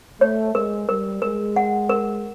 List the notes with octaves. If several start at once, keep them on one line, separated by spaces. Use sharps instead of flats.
A3 C#5
G#3 A#4
G3 A#4
G#3 A#4
F#5
A#4